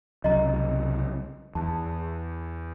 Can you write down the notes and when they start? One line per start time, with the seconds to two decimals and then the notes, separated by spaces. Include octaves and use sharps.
0.24 C2 C#3 F#3 D#5 A#5
1.55 E2 A5